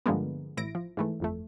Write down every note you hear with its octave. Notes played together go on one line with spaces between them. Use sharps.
G2 D3 F3 G#3 A#3 B3
A1 E4 A#6 D7
F3
G#2 E3 A3
G1 F2 A3